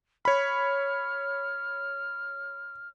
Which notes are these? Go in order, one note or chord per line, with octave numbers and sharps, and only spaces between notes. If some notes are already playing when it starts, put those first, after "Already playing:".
C#5 B5 F6